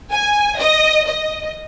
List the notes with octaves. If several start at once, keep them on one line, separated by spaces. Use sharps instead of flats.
G#5
D#5
D#5